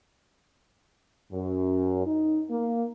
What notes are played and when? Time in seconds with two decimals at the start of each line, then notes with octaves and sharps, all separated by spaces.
1.33 F#2
2.06 D#4
2.50 A#3